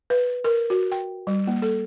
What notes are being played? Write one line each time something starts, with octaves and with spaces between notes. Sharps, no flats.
B4
A#4
F#4
G5
G3
A#3
A4